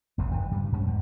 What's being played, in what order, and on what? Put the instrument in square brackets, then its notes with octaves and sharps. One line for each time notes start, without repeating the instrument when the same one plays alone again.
[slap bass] E1 A1 E2 C#3
F#1 G#2 E3
G2 C#3 G3
G#2 G3 B3 C#4
E2 G#2